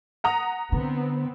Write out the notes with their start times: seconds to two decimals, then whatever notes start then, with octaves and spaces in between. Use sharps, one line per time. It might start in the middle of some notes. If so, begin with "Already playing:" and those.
0.24 F#5 A#5 D#6
0.72 D3 B3 C4